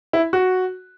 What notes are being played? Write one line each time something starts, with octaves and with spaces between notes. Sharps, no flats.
E4
F#4